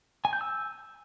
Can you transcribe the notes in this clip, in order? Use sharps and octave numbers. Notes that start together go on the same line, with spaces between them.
G#5
G6
E6